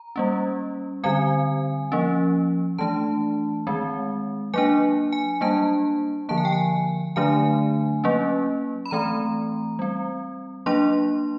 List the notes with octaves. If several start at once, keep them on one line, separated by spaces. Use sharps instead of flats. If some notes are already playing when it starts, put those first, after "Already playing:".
Already playing: A#5
G3 A#3 C#4
D3 G3 C4 G#5
F3 A#3 C#4
E3 A3 D4 A5
D#3 G#3 C4
F#3 A#3 D4 G#5
G#5
G3 A#3 D4 A5
D3 F3 A#3 A5
G#5
G5
G#5
D3 F#3 A3 D4 G#5
F#3 A#3 C#4
B5
E3 A3 C4 A#5
G3 C4
F#3 A#3 D4 C6